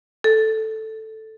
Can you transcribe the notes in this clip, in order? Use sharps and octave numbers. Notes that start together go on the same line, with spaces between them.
A4